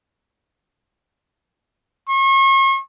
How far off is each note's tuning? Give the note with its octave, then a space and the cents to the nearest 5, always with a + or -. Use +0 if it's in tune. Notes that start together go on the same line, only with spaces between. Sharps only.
C#6 -40